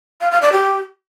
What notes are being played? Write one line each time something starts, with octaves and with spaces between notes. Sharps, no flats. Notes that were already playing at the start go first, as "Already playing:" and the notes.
F5
F5
D5
G4